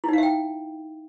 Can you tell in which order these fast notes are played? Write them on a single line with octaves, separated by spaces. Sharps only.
E4 D#4 F5 E5 G5